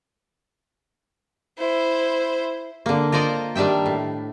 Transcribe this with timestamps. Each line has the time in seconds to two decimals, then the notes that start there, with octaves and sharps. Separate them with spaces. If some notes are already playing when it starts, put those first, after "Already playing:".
1.58 E4 C5
2.86 D3 A#3
3.12 F4 A#4 C5 D5 D#5
3.55 D#3 G3 D4 E5 G5
3.86 A2